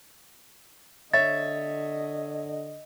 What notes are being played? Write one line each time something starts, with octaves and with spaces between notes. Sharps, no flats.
D3 C#5 D#5 E5 A6